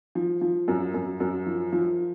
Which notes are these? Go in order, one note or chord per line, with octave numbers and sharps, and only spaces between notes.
F3
F3
F#2
F#2
F#2
F3
F3